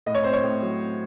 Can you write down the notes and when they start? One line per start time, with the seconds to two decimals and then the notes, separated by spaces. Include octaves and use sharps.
0.06 A2 D#5
0.15 C#5
0.24 C4 C5
0.33 C#5
0.43 A2
0.62 F#3